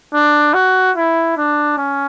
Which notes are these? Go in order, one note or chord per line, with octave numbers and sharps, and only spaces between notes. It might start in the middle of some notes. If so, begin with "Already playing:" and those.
D4
F#4
E4
D4
C#4